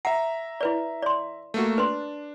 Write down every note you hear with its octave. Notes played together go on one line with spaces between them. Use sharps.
E5 F#5 A#5
E4 B4 D5
D5 C6
A3 A#3 F#4
D4 B4 C6